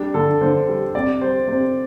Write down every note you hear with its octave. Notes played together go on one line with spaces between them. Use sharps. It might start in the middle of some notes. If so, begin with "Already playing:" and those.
Already playing: G3 D4
D3 A4
D3 C5
G3
C3 D5
G3 C5
C3 C5